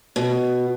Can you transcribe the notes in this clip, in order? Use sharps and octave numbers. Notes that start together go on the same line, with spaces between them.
B2